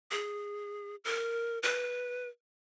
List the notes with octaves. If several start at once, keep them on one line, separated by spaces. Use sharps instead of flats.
G#4
A#4
B4